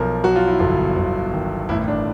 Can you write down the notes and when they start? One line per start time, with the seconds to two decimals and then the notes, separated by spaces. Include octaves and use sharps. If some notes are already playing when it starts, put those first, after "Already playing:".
Already playing: B1 F3 A4 A#4
0.24 F#3 F#4
0.35 F4
0.47 E4
0.59 G1 F4
0.96 G1
1.33 D#3
1.69 A1 E4
1.88 D4